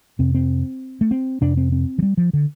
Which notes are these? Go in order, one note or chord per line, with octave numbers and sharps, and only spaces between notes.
F2 C3 C4
C4
A3
C4
F2 C3 D4
C4
C4
F3
G3
F3
D3